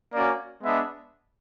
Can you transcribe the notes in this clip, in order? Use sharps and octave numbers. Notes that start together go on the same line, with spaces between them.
A#3 C#4 F#4 D5
G#3 B3 D4 E5